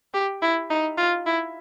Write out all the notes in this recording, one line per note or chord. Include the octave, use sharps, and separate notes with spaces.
G4
E4
D#4
F4
E4